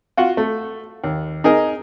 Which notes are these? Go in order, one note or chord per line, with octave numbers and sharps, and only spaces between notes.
F4 F#4 F#5
A3
D#2
D#4 G#4 A#4 D#5